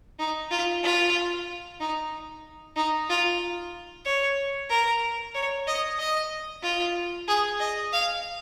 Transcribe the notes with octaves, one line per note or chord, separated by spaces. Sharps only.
D#4
F4
F4
D#4
D#4
F4
C#5
A#4
C#5
D#5
D#5
F4
G#4
D#5
F5